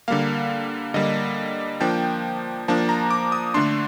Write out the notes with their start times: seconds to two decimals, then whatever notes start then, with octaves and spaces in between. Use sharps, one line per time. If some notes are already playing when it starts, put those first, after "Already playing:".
0.08 D3 G3 A#3 F5
0.94 D3 G3 A#3 D#5
1.81 F3 A#3 D4 G5
2.68 F3 A#3 D4 A5
2.89 A#5
3.10 D6
3.32 D#6
3.54 D3 A3 D4 C6